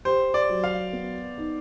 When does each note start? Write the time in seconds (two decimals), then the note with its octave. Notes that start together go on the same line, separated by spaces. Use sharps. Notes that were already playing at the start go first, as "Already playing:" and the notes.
0.05 G4 C5
0.34 D5
0.49 F#3
0.64 F5
0.93 B3
1.37 D#4